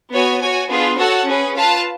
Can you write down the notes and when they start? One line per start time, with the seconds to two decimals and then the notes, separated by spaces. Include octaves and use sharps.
0.11 B3 F#4 C#5 G#5
0.41 F#4 C#5 G#5
0.69 B3 D4 F4 G#4 B4
0.97 F#4 A4 C#5 F#5 A5
1.26 C#4 G#4 B4
1.55 F4 B4 F5 A5